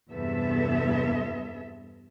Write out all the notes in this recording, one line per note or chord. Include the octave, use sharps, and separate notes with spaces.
E2 G2 C3 B3 A4 E5